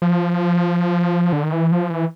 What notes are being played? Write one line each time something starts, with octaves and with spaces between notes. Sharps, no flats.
F3
D3
D#3
E3
F3
E3